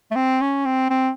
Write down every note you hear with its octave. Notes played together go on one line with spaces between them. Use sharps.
A3
C4
C#4
C4
C4